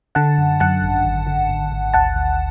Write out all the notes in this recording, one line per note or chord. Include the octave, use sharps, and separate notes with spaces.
D3 F#5 A5
F#2
F#2 F#5 A5
G#1
G#1
D3
G#1
G#1
D2 F#5 A5
D2